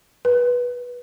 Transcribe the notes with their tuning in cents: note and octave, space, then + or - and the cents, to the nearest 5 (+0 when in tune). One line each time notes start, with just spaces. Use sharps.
B4 -15